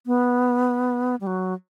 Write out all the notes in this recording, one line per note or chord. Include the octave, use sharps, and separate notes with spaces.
B3
G3
F#3